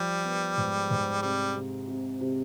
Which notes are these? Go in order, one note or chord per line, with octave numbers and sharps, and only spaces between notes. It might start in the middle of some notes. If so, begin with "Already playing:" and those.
Already playing: F3 G3
B3
G#2
G#2
C3 G3
C3
C3
C3